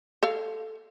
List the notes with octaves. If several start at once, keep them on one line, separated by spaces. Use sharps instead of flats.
A4 C#5 F5